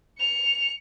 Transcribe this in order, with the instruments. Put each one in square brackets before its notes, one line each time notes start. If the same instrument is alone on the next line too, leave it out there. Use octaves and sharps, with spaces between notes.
[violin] C#7 F7